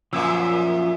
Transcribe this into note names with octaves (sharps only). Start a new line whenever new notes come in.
F#2 A#2 F3 E5 E6